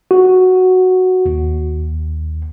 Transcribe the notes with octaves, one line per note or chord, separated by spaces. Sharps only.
F#4
D#2